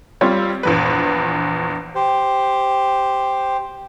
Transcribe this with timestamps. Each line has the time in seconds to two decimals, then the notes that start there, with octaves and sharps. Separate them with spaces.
0.21 G3 C4 F4 C#5
0.63 A#1 E2 B4
1.95 G4 C5